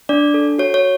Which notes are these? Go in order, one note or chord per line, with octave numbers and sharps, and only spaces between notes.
D4 D5
A4
F#4 C#5
C#5